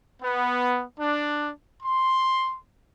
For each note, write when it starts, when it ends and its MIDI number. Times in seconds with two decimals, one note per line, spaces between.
0.21 0.83 59
0.99 1.51 62
1.83 2.55 84